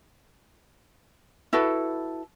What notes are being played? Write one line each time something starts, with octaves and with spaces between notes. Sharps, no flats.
E4 F#4 A4 B4